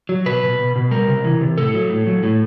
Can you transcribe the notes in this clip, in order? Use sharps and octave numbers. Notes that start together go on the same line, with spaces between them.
F#3
B2 B4
B2
B2
B2
G3 A#4
C3
E3
C3
A2 A4
F#3
A2
F#3
A2